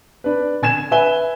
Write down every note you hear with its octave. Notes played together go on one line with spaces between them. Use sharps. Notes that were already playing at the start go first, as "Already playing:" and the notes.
D4 B4
D3 G#5 G#6 E7
B4 E5 G#5 G7